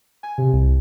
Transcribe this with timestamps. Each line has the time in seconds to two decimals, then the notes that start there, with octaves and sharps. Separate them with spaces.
0.23 G#5
0.38 C3
0.53 C2